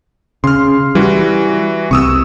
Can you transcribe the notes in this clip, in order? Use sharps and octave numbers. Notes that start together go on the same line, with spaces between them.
C#3 C6 F6
E3 G3 F#4
C2 C3 C#6 D#6 E6